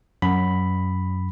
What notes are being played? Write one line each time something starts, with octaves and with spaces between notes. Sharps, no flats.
F#2 B5